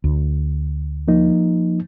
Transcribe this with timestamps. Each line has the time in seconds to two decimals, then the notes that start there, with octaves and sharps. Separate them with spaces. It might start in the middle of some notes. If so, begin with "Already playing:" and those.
0.04 D2
1.08 F3 A#3 D#4